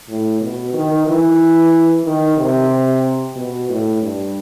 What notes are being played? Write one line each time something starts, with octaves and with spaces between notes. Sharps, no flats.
A2
B2
D#3
E3
D#3
C3
B2
A2
G2